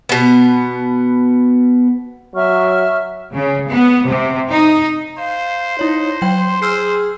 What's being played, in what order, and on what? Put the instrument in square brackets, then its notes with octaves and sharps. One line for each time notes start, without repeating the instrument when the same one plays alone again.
[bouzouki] B2 B3
[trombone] F#3 [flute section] E5 C#6 F6
[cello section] C#3
B3
C3
D#4
[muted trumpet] C5 [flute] F5
[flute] D#4 [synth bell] E4 C#5
[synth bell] F#3 G5 [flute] C6
[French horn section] G#4 [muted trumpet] C5 [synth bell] E6 F6 C7